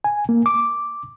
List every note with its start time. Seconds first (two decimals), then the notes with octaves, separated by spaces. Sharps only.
0.04 G#5
0.29 A#3
0.46 D6